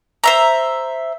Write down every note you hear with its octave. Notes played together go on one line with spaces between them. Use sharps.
C5 E5 A#5